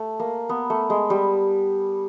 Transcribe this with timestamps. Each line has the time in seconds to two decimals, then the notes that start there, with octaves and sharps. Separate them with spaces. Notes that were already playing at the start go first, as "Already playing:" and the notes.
Already playing: A3
0.20 A#3
0.49 B3
0.70 A3
0.90 G#3
1.10 G3